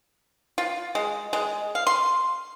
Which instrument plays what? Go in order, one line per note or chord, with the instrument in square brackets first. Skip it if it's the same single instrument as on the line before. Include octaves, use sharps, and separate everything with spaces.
[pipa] F4
G#3
G#3
F5
C6